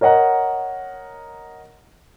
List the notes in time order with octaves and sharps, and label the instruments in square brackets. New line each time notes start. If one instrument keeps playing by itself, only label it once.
[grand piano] A#4 C#5 D#5 F#5 A#5